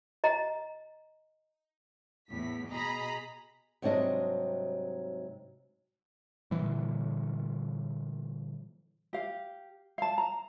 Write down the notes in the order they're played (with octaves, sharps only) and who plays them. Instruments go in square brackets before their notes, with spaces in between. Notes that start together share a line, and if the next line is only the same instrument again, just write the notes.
[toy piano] D#5 A#5
[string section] E2 A2 B6
B2 G#4 D#5 A#5 B5
[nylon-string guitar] G#2 C3 F#3 G3 D4 D#5
[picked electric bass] A#2 D3 E3 G3
[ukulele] G4 F5
F5 A5
A#5